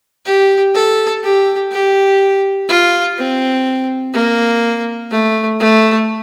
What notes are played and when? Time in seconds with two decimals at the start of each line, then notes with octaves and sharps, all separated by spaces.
0.26 G4
0.75 A4
1.23 G4
1.72 G4
2.69 F4
3.17 C4
4.14 A#3
5.11 A3
5.60 A3